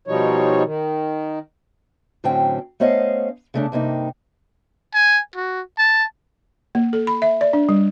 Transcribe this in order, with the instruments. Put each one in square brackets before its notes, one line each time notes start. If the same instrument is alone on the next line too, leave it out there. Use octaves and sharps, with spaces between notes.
[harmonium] B2 F3 G3 D#4 C#5
D#3
[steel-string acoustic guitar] A2 D3 F#3 C4 C#4 G5
A3 B3 C#4 C5 D#5 F5
C#3 A3 D4
G2 C3 A#3 D#4
[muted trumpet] G#5
F#4
A5
[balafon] A#3
A4
B5
E5
D5
D4
G3